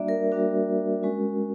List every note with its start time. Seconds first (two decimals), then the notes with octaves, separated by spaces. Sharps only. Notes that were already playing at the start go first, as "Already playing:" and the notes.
Already playing: G3 A#3 D4 F#4 D5 E5
0.08 A#4
0.32 G3 A#3 D4 F#4
1.03 G#3 C#4 F#4